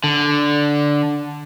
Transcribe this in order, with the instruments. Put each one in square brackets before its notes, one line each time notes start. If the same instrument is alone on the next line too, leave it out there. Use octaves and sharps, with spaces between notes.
[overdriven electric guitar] D3